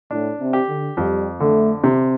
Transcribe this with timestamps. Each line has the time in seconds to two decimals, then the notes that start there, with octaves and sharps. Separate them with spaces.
0.11 A2 D4
0.40 C3
0.53 G4
0.69 D3
0.97 F2 G3
1.40 D3 A3
1.82 C3 C4